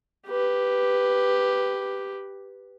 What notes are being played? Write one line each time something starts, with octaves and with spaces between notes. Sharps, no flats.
G4 B4